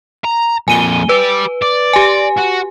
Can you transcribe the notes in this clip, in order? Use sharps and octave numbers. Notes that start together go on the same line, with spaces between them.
A#5
F2 A#2 G#5 D#7 G7
G4 B4 D5
D5
G4 G#5
F#4